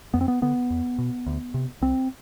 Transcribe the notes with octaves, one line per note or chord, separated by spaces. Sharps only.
F2 B3
C4
B3
D3 B3
E2
B2
D2
C3
C2 C4